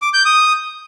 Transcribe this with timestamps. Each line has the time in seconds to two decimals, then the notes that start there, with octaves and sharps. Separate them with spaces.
0.02 D6
0.14 G6
0.26 D#6